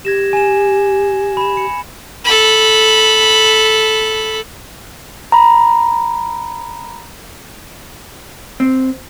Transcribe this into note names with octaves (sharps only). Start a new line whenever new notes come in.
G4 G#6 A#6 E7
G#5 E7
B5 E7
C#7
A4 B5
A#5 B5
C4